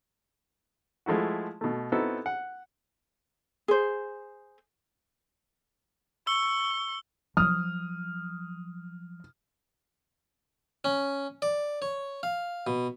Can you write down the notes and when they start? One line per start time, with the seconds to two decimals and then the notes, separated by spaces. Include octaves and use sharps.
1.06 F3 G#3 A3 E4 F#4
1.61 B2 A3
1.92 B3 C4 D#4 E4 F#4 A4
2.26 F#5
3.68 G#4 C5
6.27 C#6 E6 G7
7.37 F3 F#3 D#6 F6
10.84 C#4
11.42 D5
11.82 C#5
12.23 F5
12.67 B2